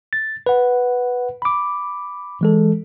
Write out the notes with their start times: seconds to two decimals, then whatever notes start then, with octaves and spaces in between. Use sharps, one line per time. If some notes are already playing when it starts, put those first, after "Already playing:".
0.13 A6
0.46 B4 F#5
1.42 B5 D6
2.41 E3 G#3 A4